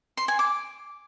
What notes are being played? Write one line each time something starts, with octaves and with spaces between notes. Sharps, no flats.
C6
G#5
D6